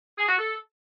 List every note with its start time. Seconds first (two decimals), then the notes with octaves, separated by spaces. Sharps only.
0.18 G#4
0.28 F#4
0.38 A4